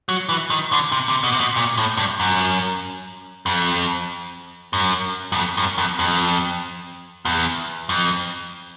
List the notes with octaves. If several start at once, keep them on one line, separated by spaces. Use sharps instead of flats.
F#3
E3
D#3
D3
C3
C3
B2
C3
B2
A#2
A2
G2
F#2
F2
F#2
F#2
F2
F#2
F2
F2
E2
F2